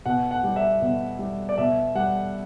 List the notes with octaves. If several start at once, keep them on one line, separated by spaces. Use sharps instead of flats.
B2 F#5
F#5
G3
E5
B2
G3
D5
B2 E5
G3 F#5